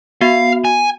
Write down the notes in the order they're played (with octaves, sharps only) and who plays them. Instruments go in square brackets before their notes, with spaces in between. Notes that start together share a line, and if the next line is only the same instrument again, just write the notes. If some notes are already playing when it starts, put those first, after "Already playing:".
[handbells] B3 F#4 [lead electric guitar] F5
[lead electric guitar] G#5